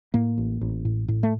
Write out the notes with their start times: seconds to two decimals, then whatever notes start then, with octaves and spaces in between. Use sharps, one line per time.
0.14 A2 A#3
0.38 A1
0.61 A1
0.85 A2
1.08 A2
1.23 A3